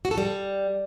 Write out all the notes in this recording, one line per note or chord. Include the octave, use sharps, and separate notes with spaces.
F#4
A4
G3